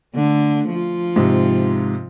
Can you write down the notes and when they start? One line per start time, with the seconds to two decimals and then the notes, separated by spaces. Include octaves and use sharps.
0.15 D3 A3
0.69 F3 F4
1.16 G#2 C3